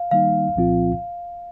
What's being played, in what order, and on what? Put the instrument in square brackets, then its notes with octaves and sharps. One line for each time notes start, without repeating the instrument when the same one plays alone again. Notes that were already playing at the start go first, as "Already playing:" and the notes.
Already playing: [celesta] F5
[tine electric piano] D#3 G3 A#3 D#4 [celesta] F5
[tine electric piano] C2 A#2 F3 C4 F4